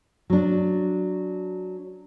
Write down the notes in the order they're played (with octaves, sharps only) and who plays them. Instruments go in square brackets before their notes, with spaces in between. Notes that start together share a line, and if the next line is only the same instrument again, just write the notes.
[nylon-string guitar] F#3 D4